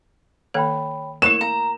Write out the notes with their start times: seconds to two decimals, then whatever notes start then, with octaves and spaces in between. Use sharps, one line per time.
0.54 D#3 A#3 A4 C#5 G5 B5
1.22 A3 A#3 E4 A#4 C#5 C#6 E7
1.41 F5 A#5